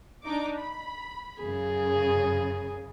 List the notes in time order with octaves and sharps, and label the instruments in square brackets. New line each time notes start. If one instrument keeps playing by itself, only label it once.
[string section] D4 D#4 D6
B5
[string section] F#2 C#3 [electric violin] G#4